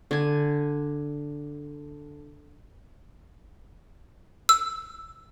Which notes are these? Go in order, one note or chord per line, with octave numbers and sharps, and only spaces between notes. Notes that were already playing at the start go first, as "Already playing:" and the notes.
D3 G#5
E6